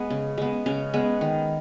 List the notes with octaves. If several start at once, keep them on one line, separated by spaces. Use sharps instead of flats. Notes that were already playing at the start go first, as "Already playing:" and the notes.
Already playing: G#3 B3
C#3
G#3 B3
C#3 C#4
G#3 B3
D#3